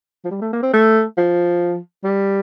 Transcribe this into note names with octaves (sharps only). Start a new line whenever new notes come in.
F3
G3
A3
A#3
C4
A3
F3
G3